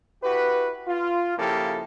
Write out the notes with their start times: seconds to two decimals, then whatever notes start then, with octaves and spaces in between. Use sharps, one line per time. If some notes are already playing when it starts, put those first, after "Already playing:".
0.24 E4 F#4 G4 B4
0.88 F4
1.38 C#3 F3 A#3 E4 G4 A4